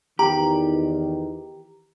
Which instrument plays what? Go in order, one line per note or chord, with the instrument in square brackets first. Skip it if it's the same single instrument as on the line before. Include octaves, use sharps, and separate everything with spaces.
[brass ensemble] E2 D#3 [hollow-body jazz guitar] G4 [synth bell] A#5